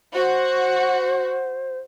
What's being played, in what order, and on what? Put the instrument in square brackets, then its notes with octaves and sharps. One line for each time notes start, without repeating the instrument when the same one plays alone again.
[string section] F#4 [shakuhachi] C5